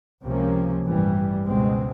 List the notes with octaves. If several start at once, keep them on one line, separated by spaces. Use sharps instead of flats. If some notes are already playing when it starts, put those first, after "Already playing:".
C#2 C3 F3 A#3 C#4
A1 G2 E3 G3
C#2 B2 G#3 C4